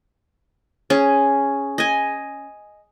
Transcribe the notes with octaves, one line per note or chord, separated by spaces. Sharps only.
C#4 G#4
D#5 G#5